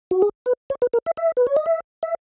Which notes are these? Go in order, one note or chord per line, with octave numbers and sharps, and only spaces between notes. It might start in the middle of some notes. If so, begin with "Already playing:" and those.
F#4
G#4
B4
C#5
B4
A#4
E5
E5
B4
C#5
D#5
E5
E5